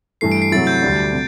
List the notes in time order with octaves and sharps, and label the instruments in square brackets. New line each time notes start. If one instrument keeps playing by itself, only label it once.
[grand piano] G2 E3 A3 [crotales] C7
[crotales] D7
C7
[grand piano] C3 F#3 A3 E4 [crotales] A6
[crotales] G6
[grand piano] D2 D3 G3 D4
C3